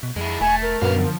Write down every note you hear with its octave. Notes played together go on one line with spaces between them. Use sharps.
B2
F2 G#3 E4
E1 A3 G#5
A#4
F#2 A#2 D3 B3 F5
D3 F3